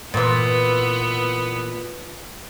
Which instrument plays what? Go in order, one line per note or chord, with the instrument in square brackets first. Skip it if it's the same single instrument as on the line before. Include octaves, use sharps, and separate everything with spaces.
[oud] A#2 E3 [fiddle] B3